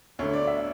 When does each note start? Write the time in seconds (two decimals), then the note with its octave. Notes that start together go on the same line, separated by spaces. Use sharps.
0.19 D2 D3 A3 C#5
0.33 D5
0.47 E5